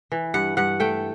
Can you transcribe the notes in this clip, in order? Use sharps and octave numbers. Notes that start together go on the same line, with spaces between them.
E3
G2 F#5
G2 F#5
A3 G5